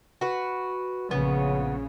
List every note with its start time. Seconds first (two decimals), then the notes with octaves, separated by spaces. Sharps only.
0.21 F#4 B4
1.11 A#1 C#3 B3